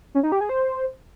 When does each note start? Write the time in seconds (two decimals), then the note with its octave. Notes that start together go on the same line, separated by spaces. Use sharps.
0.15 C#4
0.23 D#4
0.32 G4
0.41 G#4
0.49 C5